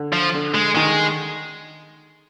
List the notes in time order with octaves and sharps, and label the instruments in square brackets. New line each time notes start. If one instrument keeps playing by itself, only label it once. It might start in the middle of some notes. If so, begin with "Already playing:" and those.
Already playing: [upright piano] D3
[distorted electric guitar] F3
[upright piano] D3
[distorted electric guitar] G#3
[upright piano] D#3 [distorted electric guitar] G#3